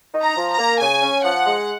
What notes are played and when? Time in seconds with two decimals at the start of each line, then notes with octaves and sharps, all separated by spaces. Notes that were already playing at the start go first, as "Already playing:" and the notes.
0.14 D#4
0.22 A#5
0.36 F3
0.52 A#5
0.58 A#3
0.80 C#3 G#5
1.02 C#4
1.24 F3 F#5
1.46 G#3